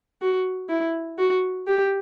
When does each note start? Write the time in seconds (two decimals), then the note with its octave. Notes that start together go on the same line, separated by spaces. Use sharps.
0.21 F#4
0.69 E4
1.18 F#4
1.67 G4